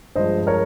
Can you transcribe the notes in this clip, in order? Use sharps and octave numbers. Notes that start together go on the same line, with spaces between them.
G2 F3 G#3 C5 D#5
A#4 C#5